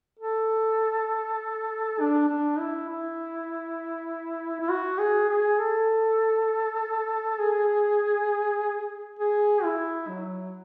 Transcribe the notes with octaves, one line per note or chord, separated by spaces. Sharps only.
A4
D4
D4
E4
E4
E4
F#4
G#4
G#4
A4
G#4
G#4
E4
F#3